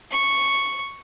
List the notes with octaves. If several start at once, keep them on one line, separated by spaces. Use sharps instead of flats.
C#6